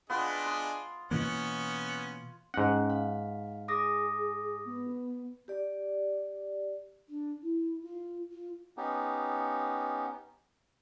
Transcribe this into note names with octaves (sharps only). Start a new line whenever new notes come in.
B3 D4 F4 G#4 D#5
C6
B2 E3 A#3 B3 C#4 F#5
G#2 C#4 F#5
F5
G#4 D6 D#6 A#6
B3
G4 D5
D4
E4
F4
F4
B3 C#4 D#4 G4